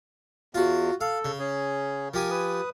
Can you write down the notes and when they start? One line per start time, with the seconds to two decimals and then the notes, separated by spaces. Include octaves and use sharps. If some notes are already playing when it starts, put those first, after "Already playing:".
0.55 E2 F4 F#4
1.01 A4 F5
1.25 C#3
1.39 C#4 G#4
2.14 F3 G4 A#4 G#5
2.31 B4 D#6